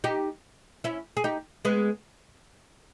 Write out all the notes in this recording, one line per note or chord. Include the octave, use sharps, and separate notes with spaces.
D#4 G4
C#4 E4
G#4
D#4 G4
G#3 B3